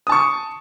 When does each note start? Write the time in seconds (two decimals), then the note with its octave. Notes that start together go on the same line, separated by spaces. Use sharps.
0.07 D#6
0.09 A5
0.12 C#6